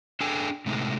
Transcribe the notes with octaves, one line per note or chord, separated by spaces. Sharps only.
D4 G#4 A4 G5 G#5
A2 C3 G#3 A3 D#4